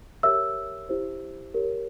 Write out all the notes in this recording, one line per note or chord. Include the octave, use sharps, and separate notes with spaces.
G4 A#4 C#5 E5 E6
E4 G4 C5
G4 A#4 C#5